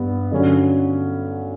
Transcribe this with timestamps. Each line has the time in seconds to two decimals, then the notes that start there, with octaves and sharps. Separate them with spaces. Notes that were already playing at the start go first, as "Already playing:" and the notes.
Already playing: G2 B3
0.31 G2 D3 F#3 C#4